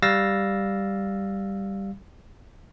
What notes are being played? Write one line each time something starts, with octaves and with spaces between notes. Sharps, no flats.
G3 F5 E6 A6 A#6